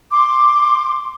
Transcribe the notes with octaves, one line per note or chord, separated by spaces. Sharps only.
C6 D6